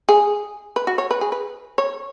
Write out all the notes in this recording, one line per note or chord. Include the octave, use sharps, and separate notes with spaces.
G#4
B4
F#4
C#5
B4
G#4
B4
C#5